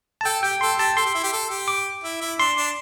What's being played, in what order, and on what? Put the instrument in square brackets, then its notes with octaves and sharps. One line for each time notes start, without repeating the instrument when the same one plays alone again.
[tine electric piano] A5
[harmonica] A4 [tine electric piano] G5
[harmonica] G4 [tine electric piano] G5
[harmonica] A4 [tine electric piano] C6
[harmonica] G4 [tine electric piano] A5
[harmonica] A4 [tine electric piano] C6
[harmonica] G4
E4
G4
A4
G4
[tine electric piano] D6
[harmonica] E4
E4
[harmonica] D4 [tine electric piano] C6
[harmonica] D4